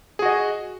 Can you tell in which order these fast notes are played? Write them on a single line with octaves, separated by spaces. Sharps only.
G#4 F#4 D#5